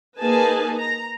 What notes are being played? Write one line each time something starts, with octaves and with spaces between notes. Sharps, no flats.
A#3 D#4 G#4 B4 G#5 A5
A#5